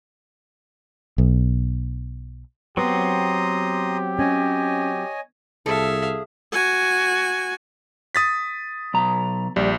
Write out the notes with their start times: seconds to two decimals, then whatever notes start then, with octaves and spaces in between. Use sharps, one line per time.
1.18 B1
2.77 F#3 B3 C4 G4 A#5 C6 D#6
4.19 C#4 C#5 D#5 G#5
5.66 C2 G#4 A4 E5 F5
6.53 F#4 G#5
8.15 D#6 A6 B6
8.94 B1 A#5
9.56 A#1 G3